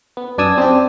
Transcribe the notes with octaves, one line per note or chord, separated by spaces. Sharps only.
B3
F#2 D4 D5 G#5 D#6 E6
C4 D4 G4